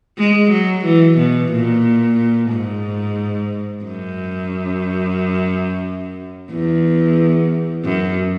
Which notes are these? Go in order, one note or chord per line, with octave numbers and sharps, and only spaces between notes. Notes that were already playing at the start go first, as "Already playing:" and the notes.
G#3
F#3
E3
B2
A#2
G#2
F#2
E2
F#2